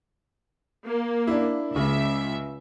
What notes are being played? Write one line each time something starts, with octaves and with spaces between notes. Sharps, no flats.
A#3
D4 E4
C#2 C#3 E5